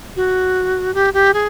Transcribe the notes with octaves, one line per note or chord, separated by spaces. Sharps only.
F#4
G4
G4
G#4